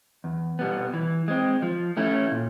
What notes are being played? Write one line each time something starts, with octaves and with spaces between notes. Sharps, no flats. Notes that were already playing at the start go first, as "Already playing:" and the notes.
E2
B2 G3 B3
E3
G#3 C4
F3
A3 C#4 E4 A4
A#2